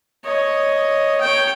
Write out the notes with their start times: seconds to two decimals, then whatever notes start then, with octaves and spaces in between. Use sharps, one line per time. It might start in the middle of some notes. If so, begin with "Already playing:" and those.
0.25 C#5 D#5
1.21 C#5 G5